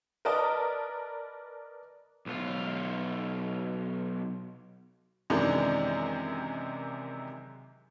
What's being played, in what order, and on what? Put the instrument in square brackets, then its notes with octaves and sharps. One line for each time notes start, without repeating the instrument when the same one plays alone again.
[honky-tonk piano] A#4 B4 D5 D#5 A5 A#5
[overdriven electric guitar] B1 F4
[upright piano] F#2 C3 D#3 E3 G#3 D4